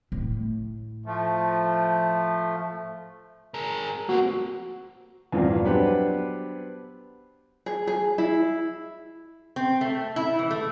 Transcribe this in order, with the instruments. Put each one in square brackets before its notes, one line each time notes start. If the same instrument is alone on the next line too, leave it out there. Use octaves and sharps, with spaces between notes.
[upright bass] A2
[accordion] F3 A3
[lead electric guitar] G#4 A#4
[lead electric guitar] A#3 C4 [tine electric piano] F#4
[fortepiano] E2 G2 A#2 F3
F#3 B3 D4 G4 B4 C5
[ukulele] G#4
G#4
E4
[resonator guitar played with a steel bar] C4
A3
E4
E3
A3